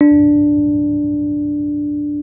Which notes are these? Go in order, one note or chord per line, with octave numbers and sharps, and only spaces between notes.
D4